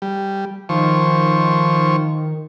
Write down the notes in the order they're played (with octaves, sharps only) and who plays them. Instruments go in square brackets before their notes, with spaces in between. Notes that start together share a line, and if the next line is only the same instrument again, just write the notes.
[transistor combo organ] G3
[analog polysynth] D#3 [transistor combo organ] F3 C5 C#6